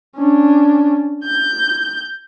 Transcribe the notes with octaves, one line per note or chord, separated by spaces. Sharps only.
C#4 D4
G6